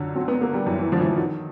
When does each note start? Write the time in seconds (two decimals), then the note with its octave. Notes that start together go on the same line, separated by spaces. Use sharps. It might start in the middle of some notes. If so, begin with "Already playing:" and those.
Already playing: F#2 D3
0.15 F#3 C4
0.28 B3
0.41 A#3 B3
0.54 G3
0.66 F#2 E3
0.79 E3
0.92 D3 F3
1.00 E3
1.05 F3
1.17 D#3 F#3